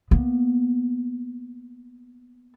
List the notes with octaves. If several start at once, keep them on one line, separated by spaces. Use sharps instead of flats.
A#3 B3